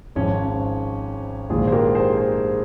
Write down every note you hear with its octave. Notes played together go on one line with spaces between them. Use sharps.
G#1 G#2 F3 C#4
A#1 G#2 D#3 F4 G#4
C5
G4 A#4
G#4 C5
G#4 C5